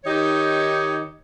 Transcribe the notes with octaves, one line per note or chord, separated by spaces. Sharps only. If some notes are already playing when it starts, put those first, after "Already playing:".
D#3 D#4 G4 C#5